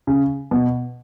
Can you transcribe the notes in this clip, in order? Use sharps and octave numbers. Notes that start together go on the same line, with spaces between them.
C#3
B2